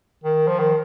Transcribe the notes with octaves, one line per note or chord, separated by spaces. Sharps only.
D#3
F3
D#3